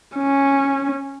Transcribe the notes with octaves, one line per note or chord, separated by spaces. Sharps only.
C#4